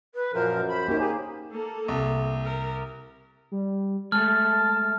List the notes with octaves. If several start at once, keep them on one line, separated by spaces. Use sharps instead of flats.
B4
F#2 A#2 F3 A#4 C5
C5 B5
A#3 C#4 D#4 G4
G4 G#4
A#3 A4
C2
A#4
G3
G#3 A3 A5 F6